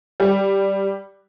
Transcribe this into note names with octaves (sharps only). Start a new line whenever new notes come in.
G3